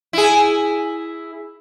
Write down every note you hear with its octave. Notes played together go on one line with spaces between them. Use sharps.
E4 G#4